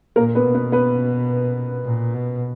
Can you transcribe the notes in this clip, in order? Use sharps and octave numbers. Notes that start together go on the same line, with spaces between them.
A#2 A#3 A#4
B3 B4
B2
B3 B4
B3 B4
A#2
B2